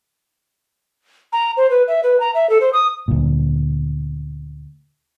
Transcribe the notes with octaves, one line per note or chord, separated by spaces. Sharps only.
A#5
C5
B4
E5
B4
A#5
E5
A4
C5
D#6
D2 A#2